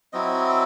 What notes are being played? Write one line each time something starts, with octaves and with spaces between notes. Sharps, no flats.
F#3 C4 E4 D#5